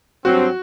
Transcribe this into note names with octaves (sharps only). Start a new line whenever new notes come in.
G2 F#3 C4 F#4